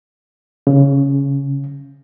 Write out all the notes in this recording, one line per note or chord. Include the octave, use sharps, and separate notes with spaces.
C#3